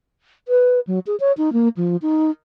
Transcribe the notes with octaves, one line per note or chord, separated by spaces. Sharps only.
B4
F#3
G#4
C#5
D#4
A#3
F3
D#4